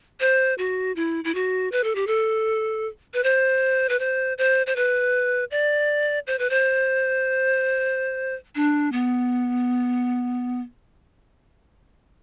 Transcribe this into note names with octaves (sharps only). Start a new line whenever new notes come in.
C5
F#4
E4
E4
F#4
B4
A4
G4
A4
B4
C5
B4
C5
C5
C5
B4
D5
C5
B4
C5
D4
B3